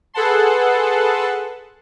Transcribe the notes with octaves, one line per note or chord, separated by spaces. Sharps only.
G#4 A4 B4 F#5 A5 C6